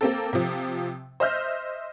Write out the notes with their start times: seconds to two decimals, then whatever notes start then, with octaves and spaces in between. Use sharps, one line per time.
0.01 A#3 C4 A4
0.33 C3 F3
1.20 C5 D#5 E5 F6 G6